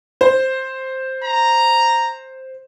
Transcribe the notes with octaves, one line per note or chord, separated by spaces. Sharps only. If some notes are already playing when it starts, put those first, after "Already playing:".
C5
A#5